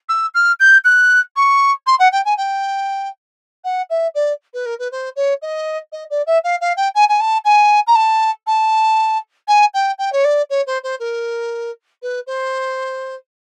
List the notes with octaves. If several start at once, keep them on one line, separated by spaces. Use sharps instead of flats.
E6
F6
G6
F#6
C#6
C6
F#5
G5
G#5
G5
F#5
E5
D5
B4
A#4
B4
C5
C#5
D#5
D#5
D5
E5
F5
F5
G5
G#5
G#5
A5
G#5
A#5
A5
A5
G#5
G5
G5
C#5
D5
C#5
C5
C5
A#4
B4
C5